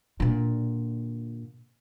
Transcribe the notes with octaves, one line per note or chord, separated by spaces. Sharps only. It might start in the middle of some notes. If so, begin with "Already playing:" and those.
A#2 D3